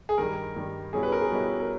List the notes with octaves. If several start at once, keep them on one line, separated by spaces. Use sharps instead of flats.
G#4
G2 D#3 G3 A#4
G2 D#3 G3
B2 G3 C#4 E4 G#4
B4
A#4
G#4
B2 G3 C#4 E4
A#4